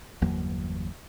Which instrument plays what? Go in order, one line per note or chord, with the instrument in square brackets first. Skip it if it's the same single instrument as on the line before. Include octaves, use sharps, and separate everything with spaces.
[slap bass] G1 E2 F#3 A#3